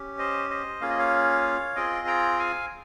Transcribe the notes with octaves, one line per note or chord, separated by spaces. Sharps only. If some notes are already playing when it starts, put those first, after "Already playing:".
Already playing: C#4 G4
C5 D#5
C5 D#5
A#3 C#4 F4 G#4 F5
D#5
C#5 F5
C4 F4 G#4 D#5 G5
G5 A#5
F5 G#5